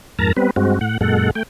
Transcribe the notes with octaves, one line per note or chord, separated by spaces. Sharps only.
F2 G#2 A#4 A5 A#5
G3 B3 C4 B4
G2 G#3 C4 F#4
A2 F#5
F#2 A#2 G#3 A4 F#5
A3 G5